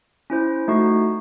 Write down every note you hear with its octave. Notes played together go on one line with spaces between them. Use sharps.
C#4 E4 C5
A3 D#4 F#4